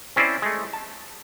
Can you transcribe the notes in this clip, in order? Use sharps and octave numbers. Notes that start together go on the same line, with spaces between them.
C4 C#4 E4 C5 D5
G#3 A3
A5